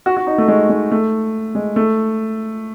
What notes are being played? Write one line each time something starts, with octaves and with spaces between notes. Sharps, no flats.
F#4
F#4
D#4
A3
G#3
G#3
A3
G#3
A3